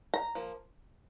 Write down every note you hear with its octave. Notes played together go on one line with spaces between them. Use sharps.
A#5
F3 A#3